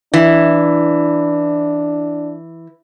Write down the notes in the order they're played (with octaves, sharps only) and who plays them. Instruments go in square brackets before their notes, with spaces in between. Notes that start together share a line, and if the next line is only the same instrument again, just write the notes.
[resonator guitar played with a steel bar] E3 [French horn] D4